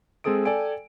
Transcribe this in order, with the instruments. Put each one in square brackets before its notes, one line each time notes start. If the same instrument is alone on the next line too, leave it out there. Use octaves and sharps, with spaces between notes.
[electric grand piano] G#3 C4 G#4 A4 D#6 D7
A4 D5 G5 G#5 D7